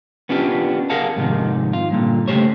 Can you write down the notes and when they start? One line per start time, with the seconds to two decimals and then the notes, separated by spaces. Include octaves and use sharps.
0.29 B3 C#4 D4 F4 G4
0.90 G#4 A#4 F5 F#5 A5
1.16 F2 G#2 C3 D#3
1.73 F4
1.90 G2 A#2 D3
2.28 C#3 E3 A3 G4 C5 C#5